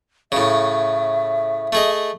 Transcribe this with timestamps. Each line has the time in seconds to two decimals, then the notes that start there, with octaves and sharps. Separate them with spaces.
0.32 A2 C#3 E5
1.73 A3 G#4 D#5